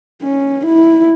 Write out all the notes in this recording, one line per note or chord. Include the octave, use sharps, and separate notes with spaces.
C#4
E4